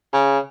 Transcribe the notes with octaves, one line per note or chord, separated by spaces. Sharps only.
C#3